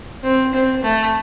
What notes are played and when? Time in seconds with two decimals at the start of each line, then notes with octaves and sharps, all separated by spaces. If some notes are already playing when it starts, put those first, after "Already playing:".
0.23 C4
0.53 C4
0.83 A3